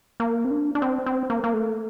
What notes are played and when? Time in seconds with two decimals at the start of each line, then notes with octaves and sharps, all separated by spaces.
0.20 A#3
0.45 C4
0.51 D4
0.75 D4
0.82 C4
1.06 C4
1.30 A#3
1.44 A#3
1.53 A3